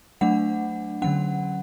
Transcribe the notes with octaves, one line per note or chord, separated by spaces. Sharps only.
F#3 A3 D4 F#5
D3 F#3 C#4 F#5